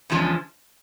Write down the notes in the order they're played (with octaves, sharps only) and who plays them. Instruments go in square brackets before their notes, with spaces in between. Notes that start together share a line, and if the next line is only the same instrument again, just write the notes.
[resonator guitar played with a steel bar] E2 C#3 F3 G#3 C#4